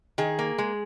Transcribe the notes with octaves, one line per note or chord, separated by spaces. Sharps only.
D#3 G#4
A#3
G#3